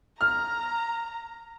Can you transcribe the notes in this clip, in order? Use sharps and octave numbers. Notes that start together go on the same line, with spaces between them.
A#5 F6